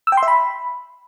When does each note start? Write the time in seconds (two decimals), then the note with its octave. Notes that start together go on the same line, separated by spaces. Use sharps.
0.07 E6
0.12 G5
0.17 C6
0.23 E5
0.28 B5